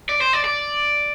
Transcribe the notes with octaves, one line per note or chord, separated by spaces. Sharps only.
D5
C5
D5
D5